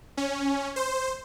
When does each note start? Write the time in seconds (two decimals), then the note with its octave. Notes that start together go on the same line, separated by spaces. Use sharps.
0.17 C#4
0.76 C5